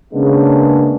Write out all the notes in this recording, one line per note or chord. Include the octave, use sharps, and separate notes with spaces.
C#3 G#3 A#3 B3 C#4 D4